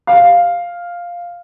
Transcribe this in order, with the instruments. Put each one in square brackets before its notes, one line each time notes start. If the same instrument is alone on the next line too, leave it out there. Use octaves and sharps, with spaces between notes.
[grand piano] F5